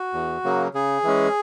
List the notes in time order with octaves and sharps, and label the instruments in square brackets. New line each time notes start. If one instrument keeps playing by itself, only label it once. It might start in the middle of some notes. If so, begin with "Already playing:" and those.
Already playing: [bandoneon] F#4
E2
C#3 F#3 A#3
C#3 G#4
E3 G#3 C#4